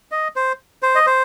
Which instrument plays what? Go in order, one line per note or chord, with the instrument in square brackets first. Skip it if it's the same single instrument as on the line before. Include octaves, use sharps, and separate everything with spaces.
[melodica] D#5
C5
C5
D#5
C5